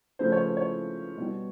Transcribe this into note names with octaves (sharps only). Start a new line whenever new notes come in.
C#3 F3 A3 C5
C#5
C5
C#5
B2 G3